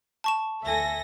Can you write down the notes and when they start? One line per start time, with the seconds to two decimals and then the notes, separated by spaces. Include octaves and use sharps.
0.24 A5 C#6 E7
0.63 D2 A4 E5 G#5 A#6